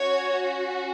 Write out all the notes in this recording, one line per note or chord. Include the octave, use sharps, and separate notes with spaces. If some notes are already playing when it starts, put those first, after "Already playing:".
Already playing: C#4 F#4 C#5